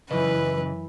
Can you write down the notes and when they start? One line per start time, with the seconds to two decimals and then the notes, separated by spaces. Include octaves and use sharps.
0.11 F#2 C#3 E3 B4 D#5